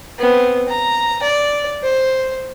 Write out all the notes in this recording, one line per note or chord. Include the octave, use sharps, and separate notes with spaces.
B3 C4
A#5
D5
C5